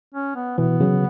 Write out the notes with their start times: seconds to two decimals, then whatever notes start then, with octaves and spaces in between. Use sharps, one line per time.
0.14 C#4
0.36 B3
0.58 B2 E3 B3
0.80 C#3 F#3